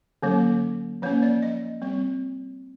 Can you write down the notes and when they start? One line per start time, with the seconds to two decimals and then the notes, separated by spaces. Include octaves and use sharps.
0.22 D3 F#3 A#3 C#4
1.02 F3 A#3 C#4 C#5
1.23 D5
1.42 D#5
1.82 G3 C4